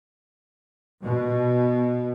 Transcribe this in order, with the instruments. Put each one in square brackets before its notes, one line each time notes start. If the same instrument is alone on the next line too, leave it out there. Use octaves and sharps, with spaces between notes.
[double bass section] B2